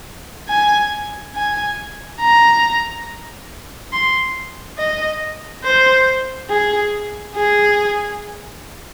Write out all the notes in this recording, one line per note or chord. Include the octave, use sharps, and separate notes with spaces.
G#5
G#5
A#5
C6
D#5
C5
G#4
G#4